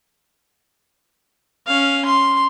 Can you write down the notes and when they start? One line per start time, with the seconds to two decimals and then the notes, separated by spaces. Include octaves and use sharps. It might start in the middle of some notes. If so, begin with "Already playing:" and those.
1.67 C#4 F5
2.05 C6